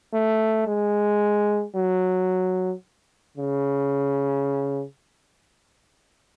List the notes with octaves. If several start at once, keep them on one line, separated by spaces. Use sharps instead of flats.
A3
G#3
F#3
C#3